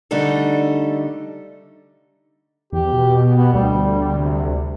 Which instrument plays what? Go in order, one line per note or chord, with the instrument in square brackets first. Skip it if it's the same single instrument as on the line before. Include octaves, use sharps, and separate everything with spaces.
[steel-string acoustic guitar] D3 G3 A3 D#4 A4
[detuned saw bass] E2 [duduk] G4
[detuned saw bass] B2
[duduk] B3
[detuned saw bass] D2 [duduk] G3
[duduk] C3